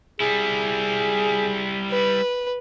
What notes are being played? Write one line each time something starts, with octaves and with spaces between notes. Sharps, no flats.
G3 E4 G#4
B4